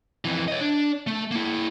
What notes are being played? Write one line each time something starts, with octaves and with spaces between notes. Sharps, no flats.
F2 E3
C#5 D#5
D4
A3
A#3 E4